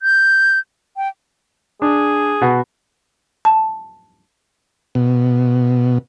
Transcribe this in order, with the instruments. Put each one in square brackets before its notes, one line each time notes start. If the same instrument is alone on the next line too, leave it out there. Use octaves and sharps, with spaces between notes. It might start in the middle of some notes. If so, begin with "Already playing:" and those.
[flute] G6
G5
[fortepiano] D4 [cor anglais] G#4
[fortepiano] B2 F#4
[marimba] A5
[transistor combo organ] B2